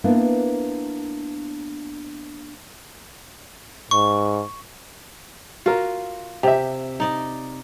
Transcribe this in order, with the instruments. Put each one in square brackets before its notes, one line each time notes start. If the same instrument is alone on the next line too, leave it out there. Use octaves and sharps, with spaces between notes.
[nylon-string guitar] A#3 B3 D4 E4 A#4
[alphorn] G#2 [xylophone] C#6
[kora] F4 [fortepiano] F#4 A#4
[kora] C3 [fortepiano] G4 E5
[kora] D#4 D5 D#5